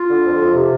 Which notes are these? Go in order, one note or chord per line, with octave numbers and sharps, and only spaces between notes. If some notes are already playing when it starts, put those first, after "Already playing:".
Already playing: F4
D3
F2
F2
C3